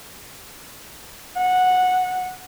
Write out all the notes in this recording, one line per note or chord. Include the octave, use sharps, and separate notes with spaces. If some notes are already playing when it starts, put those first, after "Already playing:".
F#5